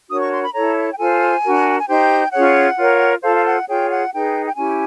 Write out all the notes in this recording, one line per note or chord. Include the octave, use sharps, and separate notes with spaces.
D4 F#4 A#4 C#5 D#6
C#6
C6
B5
E4 A4 C#5 A#5
A5
G5
F4 A4 C5 G#5
D4 F#4 A#4
G#5
D#4 G4 C5 G5
C#4 F4 G#4 C#5 F#5
F4 A#4 C#5
F4 A4 C5 F5
F5
F#5
F4 G#4 C#5 G5
F#5
D#4 G#4 B4 G5
G5
C#4 E4 G4 G#5